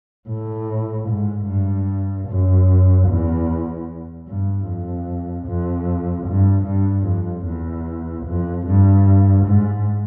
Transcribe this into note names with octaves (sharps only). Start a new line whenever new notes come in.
A2
G#2
G2
F#2
E2
G2
F2
F2
G2
G2
F2
E2
F2
G2
G#2